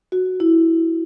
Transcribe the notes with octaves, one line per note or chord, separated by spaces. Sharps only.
F#4
E4